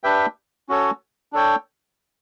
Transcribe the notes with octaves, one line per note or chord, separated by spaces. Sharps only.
D4 G4 B4 E5 G5
C#4 F#4 A4 C#5
D4 A4 C#5 G5